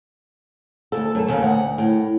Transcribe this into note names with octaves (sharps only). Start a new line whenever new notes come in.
D2 G#2 A4
F#2 A4
D#2 C#3
D2 F#5
A2